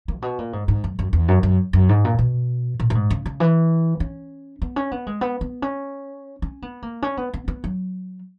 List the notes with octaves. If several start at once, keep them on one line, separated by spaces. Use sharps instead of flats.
A#3
A#2
B2
A#2
G#2
G#2
F#2
F#2
E2
F#2
F#2
F#2
G#2
A#2
B2
A#2
A#2
G#2
C#3
C#3
E3
C#4
B3
C#4
B3
G#3
B3
B3
C#4
C#4
B3
A#3
C#4
B3
B3
B3
F#3